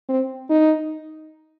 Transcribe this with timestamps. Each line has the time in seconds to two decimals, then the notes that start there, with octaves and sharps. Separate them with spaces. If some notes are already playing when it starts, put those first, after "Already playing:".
0.09 C4
0.50 D#4